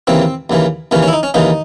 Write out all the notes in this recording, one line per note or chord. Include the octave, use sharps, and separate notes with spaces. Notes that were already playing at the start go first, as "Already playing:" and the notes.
D#2 C#3 E3 C4
D#2 C#3 E3
D#2 C#3 E3 C#4
C#4
E4
D#4
C#4
D#2 C#3 E3 D#4